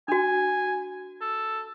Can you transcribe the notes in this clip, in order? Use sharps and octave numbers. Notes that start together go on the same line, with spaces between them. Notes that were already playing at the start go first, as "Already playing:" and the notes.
D4 F#4 G#5
A4